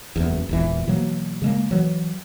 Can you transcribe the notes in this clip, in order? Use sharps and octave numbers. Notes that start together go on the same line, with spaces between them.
F#1 E2
E1 A#1 E3
B2 E3 F#3 A#3
C#3 G#3 A#3
E3 F#3